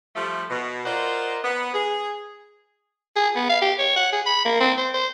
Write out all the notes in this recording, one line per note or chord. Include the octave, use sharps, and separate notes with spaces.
F3 G3 A3
B2
F4 A#4 C5 D5 D#5 F#5
B3
G#4
G#4
B3
F5
G4
C#5
F#5
G#4
B5
A#3
C4
C5
C5